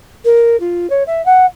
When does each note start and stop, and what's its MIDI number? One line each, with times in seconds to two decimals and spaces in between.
0.25 0.59 70
0.60 0.89 65
0.90 1.03 73
1.07 1.24 76
1.26 1.46 78